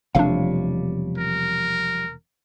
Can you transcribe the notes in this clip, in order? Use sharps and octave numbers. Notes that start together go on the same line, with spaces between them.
E1 C3 F3 G3 A3 D4 C#5 F5
A#4